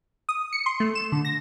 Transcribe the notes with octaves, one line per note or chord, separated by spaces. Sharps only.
D#6
C#7
C6
A3
E7
D3
A#6